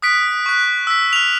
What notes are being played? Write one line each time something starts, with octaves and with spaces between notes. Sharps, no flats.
D#6 F#6 B6 D7
C#6 F#6
E6 B6
F6 F7